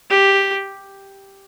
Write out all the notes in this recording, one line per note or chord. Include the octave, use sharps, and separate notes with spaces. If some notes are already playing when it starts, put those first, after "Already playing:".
G4